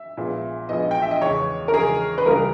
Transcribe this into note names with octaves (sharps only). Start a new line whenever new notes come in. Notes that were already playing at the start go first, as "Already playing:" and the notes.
Already playing: E5
A#1 A#2 G#3 B3
A#1 A#2 G#3 B3 D#5
G5
E5
D#5
E2 C#3 G#3 C#5
A#4
E2 C#3 G#3 G#4
B4
C#2 C#3 E3 G3 A#3 A#4